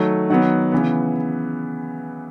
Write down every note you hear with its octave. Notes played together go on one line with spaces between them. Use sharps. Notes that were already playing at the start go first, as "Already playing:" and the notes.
Already playing: D#3 F#3 A3
D#3 F#3 B3 F#5
C#3 E3 B3